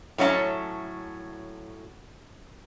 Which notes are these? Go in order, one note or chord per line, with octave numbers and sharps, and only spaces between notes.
A2 F#3 C#4 D#5 A5